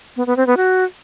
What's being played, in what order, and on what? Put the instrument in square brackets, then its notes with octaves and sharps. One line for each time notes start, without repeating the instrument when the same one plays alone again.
[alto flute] B3
B3
C4
B3
F#4